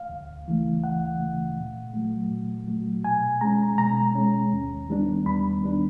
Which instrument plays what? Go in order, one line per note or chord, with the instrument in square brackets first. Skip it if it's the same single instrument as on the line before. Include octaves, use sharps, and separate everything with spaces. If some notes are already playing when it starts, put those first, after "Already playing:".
Already playing: [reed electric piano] F5
D2
C#3 E3 A3
D2 F#5
C#3 E3 A3
A#2
F#3 A3
A#2
F#3 A3
B2 G#5
G#3 C#4 A#5
B2 A#5
G#3 C#4
D#2
D#3 G3 B3 D4
D#2 B5
D#3 G3 B3 D4